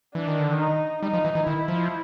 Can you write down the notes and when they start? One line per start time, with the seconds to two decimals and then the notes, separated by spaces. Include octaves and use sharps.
0.15 E3 D4
0.27 D#3
0.40 D3
0.52 D#3
0.59 D#4
1.02 G3 D#4
1.13 F3
1.25 E3
1.35 E3
1.47 D#3 E4
1.68 F3